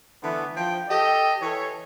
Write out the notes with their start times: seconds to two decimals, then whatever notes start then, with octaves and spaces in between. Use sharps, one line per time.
0.23 D3 E3 A3 B3
0.56 F3 G5
0.90 G4 A4 D#5
1.42 E3 A4 C#5